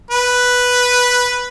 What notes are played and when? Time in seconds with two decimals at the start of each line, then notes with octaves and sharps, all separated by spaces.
0.11 B4